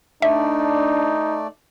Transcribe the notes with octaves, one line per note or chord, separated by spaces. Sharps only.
A3 D4 D#4 D5 E5